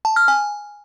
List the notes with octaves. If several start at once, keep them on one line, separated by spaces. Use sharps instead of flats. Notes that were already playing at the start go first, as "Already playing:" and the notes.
A5
F6
G#5